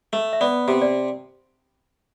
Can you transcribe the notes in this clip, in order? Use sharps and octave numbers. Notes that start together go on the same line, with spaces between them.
A3
E5
B3 D5
C3
D5